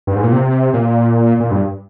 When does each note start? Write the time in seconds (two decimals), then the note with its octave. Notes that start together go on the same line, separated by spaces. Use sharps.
0.07 G2
0.15 G#2
0.24 A#2
0.32 C3
0.74 A#2
1.40 A#2
1.51 G2